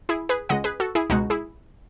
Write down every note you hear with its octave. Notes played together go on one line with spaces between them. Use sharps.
E4 G#4
G#4 B4
C#2 C#3 G#3 D#5 F#5
G#4 B4
F#4 A4
E4 G#4
C#2 B2 G#3 D#4 F#4
E4 G#4